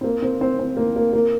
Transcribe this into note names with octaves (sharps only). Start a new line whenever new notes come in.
C4
A#3
C4
C4
C4
A#3
A#3
A#3